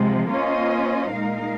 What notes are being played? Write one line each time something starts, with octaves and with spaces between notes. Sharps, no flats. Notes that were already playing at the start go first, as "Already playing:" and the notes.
Already playing: C3 F3 G#3
A#3 C#4 F4 C5 D#5
A#2 G#3 D#4 A#4 F5